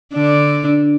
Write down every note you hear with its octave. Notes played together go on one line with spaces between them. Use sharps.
D3 D4